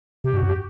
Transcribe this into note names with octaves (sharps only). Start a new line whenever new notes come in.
C3 G4
G2 F#4
F#2
G4